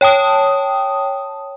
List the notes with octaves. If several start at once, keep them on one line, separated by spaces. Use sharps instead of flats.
C#5 G5 A5 D#6